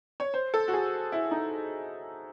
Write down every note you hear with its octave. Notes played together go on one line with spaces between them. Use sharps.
C#5
C5
A4
F#4
G#4
E4
D#4